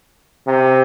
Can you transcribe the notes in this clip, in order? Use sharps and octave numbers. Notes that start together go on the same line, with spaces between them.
C3